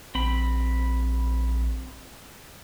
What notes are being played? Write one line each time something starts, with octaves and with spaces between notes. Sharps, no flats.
A#1 C4 B5